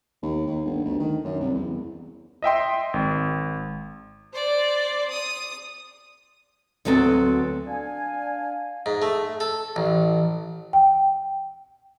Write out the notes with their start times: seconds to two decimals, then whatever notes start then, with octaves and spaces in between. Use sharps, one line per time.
0.22 D#2
0.47 D#2
0.65 G1
0.85 D2
0.99 D#3
1.24 F#2
1.41 C2
1.55 E2
2.42 D#5 E5 G5 C6
2.94 G#1
4.33 C5 D5
5.10 D#6
6.85 D2 F#3 B3 C4 A4
7.67 D4 F5 G#5
8.86 G#2
9.02 A3
9.40 A4
9.76 A1
10.73 G5